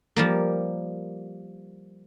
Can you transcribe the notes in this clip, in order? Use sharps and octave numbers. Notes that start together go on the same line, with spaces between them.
F3 G3 A#3